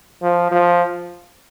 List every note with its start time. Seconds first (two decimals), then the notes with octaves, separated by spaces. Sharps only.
0.22 F3
0.51 F3